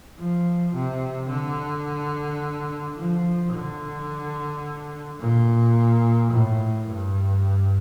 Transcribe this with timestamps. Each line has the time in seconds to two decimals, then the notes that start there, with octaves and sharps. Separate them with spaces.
0.20 F3
0.75 C3
1.30 D3
2.97 F3
3.54 D3
5.20 A#2
6.32 A2
6.88 G2